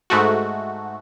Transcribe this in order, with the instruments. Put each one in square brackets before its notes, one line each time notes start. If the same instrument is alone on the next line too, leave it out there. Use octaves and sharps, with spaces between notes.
[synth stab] G#2 A3 F#4